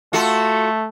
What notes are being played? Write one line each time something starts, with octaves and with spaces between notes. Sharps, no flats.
A3 F4 F#4 A4